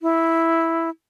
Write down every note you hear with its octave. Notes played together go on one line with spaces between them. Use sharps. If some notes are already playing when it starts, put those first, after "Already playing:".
E4